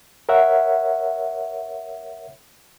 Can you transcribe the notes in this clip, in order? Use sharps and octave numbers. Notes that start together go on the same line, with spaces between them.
A#4 C#5 E5 F#5